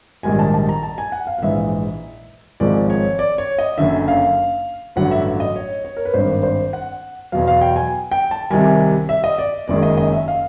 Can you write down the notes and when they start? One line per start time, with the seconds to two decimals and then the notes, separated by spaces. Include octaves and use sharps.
0.23 A#1 G#2 D#3 G3 G#5
0.39 A5
0.54 A5
0.69 A#5
0.83 A5
0.98 G#5
1.12 F#5
1.27 F5
1.39 F5
1.42 A#1 G#2 E3 E5
2.60 G#1 G#2 F3 G#3 D5
2.90 C#5
3.19 D5
3.38 C#5
3.58 D#5
3.78 F#1 F#2 D3 E5
4.08 F5
4.96 A1 G2 D3 F#3 F#5
5.11 E5
5.40 D#5
5.56 C#5
5.85 C#5
5.97 A#4
6.05 B4
6.14 G#1 G2 D#3 C5
6.43 C5
6.73 F#5
7.32 E2 B2 F#3 F5
7.48 F5
7.61 G5
7.76 G#5
8.12 G5
8.31 A5
8.50 C2 C3 D#3 G3 G#5
9.09 E5
9.24 D#5
9.38 D5
9.68 F#1 F#2 D#3 G#3 D5
9.83 D#5
9.97 D#5
10.12 E5
10.28 F5